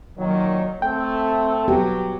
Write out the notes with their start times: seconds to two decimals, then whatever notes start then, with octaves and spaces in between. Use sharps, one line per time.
0.18 A#2 D#3 F#3
0.82 A3 C4 A4 G5
1.68 F#3 B3 G4